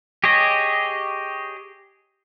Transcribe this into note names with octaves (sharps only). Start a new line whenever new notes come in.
G4 G#4 C#5 D#5